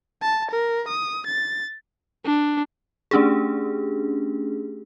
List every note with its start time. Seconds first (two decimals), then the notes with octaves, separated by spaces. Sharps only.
0.22 A5
0.51 A#4
0.88 D#6
1.26 A6
2.25 D4
3.11 A3 C#4 D4 G4 G#4